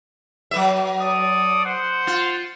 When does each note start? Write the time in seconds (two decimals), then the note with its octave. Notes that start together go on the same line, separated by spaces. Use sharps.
0.51 F#3 B4 E5
1.00 A4 D5 D#6
1.64 C5 F#5
2.07 F4